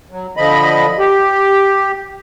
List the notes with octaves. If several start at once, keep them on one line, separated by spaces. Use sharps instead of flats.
F#3
D3 F3 D#5 B5
G4